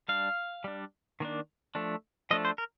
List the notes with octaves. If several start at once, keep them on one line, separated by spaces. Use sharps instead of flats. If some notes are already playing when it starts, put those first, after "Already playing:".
G3 D4 F5
G3 D4
D#3 A#3 D4
F3 A3 D4
F3 A3 D4 D#5
C5
A#4